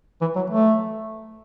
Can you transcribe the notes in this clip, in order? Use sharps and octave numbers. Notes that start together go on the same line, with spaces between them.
E3
F#3
A3